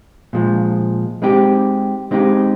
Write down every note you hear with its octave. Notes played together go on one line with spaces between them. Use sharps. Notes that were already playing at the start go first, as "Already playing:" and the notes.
A#2 F3 G#3
G#3 C4 D#4 G4
G#3 C4 D#4 G4